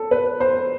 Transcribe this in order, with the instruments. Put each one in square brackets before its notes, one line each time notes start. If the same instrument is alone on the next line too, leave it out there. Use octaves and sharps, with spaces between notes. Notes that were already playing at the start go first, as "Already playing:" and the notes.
Already playing: [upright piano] A4
B4
C5